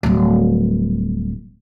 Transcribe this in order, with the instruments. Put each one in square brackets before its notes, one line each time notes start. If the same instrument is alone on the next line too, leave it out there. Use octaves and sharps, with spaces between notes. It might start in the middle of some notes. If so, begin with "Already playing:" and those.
[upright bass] D1 G3